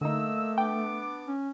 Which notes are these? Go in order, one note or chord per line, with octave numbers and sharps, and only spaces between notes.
D3 A3 A#3 D#4 D#5 E6
B3 D4 G5 D6
C#4